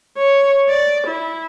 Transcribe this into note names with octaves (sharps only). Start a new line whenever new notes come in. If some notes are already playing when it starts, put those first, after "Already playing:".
C#5
D5
E4